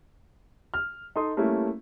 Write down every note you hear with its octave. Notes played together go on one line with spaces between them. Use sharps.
F6
D#4 A4 C6 D#6
G3 A3 A#3 C#4 E4